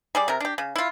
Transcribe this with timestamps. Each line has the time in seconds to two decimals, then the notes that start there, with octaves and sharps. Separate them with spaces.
0.15 G3 G#4 D5
0.28 C3 A#4
0.40 D4 G4
0.58 C#3
0.76 E4 F4